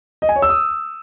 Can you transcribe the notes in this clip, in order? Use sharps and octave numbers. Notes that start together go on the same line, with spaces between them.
D#5
G#5
C#5
E6
D#6